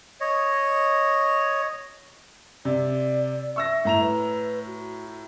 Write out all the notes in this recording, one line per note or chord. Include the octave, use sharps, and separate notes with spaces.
C#5 D#5
C3 D5
E5 C#6 E6 A#6
A2 A#5 F7
B4
F#4